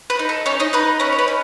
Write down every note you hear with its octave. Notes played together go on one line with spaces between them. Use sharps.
B4
D#4
A4
C#4 D#4 C#5
D#4 D#5
D#4 B4
C#4 B4
C#5
B4
C#4